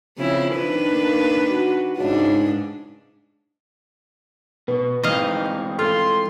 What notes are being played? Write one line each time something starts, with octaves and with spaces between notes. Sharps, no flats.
C#3 F3 C4 E4
D#3 D4 B4
A#3
F#4
C#2 G#2 D4
B2 B4
E3 G#3 C4 D#4 D#5 F5
F4 A4 C6